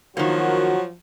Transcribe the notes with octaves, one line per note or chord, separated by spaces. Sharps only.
D#3 F3 F#3 A#3 F#4